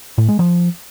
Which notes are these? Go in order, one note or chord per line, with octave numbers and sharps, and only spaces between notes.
A2
G#3
F3